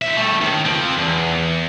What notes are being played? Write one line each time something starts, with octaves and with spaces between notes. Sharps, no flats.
D#4 E5
G3 A3
C#2 D#3
F3 C4
E2